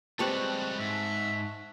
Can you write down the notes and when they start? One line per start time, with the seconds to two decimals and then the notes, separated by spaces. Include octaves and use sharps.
0.19 G3 G#3 C4 G4 B4 A5 C#6 F#6
0.79 G#2 E5